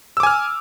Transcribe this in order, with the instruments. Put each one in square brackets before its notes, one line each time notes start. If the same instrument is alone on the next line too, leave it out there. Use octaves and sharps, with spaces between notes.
[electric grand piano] E6
D6
G#5
F6